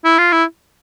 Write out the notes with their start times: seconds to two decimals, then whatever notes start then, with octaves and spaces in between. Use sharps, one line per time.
0.05 E4
0.18 F4
0.32 E4